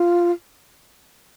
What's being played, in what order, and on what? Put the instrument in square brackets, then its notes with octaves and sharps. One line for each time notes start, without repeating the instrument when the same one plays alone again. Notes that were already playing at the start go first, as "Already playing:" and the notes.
Already playing: [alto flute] F4